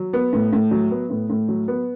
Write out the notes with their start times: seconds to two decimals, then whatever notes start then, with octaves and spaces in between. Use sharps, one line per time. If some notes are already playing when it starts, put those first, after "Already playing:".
Already playing: F#3
0.13 B3
0.33 A2
0.53 A2
0.71 F#3
0.91 B3
1.10 A2
1.30 A2
1.48 F#3
1.68 B3